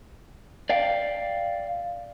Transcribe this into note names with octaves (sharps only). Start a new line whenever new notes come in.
D5 F5 G5